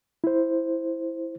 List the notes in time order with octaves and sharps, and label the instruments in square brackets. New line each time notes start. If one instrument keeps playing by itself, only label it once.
[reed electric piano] E4 C5